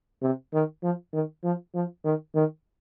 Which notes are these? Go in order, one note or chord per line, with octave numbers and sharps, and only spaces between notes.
C3
D#3
F3
D#3
F3
F3
D#3
D#3